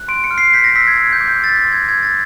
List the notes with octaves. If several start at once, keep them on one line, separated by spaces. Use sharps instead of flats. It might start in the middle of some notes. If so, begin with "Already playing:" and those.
Already playing: F#6
C6 D7
C#7
F6
C7
G6 B6
A#6
E6 B6
G#6
F#6 G#6
G6
D6
G6
E6 A6
B6
A#6
C6 A6
G#6
E6 G#6
A6